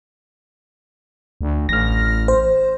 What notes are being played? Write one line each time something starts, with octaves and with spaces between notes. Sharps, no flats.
D2
A1 F6 A#6
C5